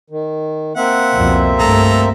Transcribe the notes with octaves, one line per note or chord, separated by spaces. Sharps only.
D#3
A#3 C4 E5 F#5
C2 F2 B2
G2 A3 A4 A#5